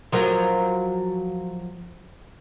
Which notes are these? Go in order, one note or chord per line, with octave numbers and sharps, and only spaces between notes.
F3 F#3 A#4